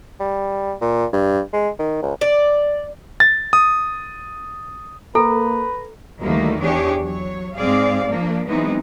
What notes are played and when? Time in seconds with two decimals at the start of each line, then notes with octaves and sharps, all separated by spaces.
0.20 G3
0.81 A#2
1.13 G2
1.53 G#3
1.79 D#3
2.02 C#2
2.21 D5
3.20 A6
3.53 D#6
5.15 A#3 A4 B4 A#5
6.21 D2 D#3 E3 G3 A3 A#3
6.59 E2 D4 G4 G#4 C#5
7.01 F#3 C#5
7.55 G#2 C4 G#4 D5 F5
8.10 F3 A#3 D4
8.47 E3 F#3 G#3 B3 C4 D#4